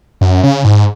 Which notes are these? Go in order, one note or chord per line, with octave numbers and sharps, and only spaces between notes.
F#2
C#3
G#2